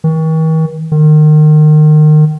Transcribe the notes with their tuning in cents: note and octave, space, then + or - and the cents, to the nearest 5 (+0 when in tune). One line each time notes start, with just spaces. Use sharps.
D#3 +45
D#3 -30